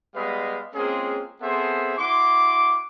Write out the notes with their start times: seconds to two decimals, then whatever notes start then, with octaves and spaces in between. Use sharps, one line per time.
0.14 G3 G#3 B3 B4 D#5 F5
0.74 G#3 A#3 C4 C#4 F4 G#4
1.41 B3 C4 G#4 A4 C5 E5
1.97 E4 F#4 C6 D6